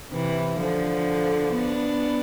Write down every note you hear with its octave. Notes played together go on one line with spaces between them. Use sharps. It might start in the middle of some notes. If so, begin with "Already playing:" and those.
C3 E3
D3 F3
B3 D4